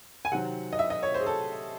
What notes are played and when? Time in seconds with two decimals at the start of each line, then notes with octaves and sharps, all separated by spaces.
0.25 G#5
0.31 C3 D#3 F#3 C4 F#5
0.73 D#5
0.79 E5
0.90 D#5
1.03 C#5
1.14 C5
1.20 G#4
1.26 A4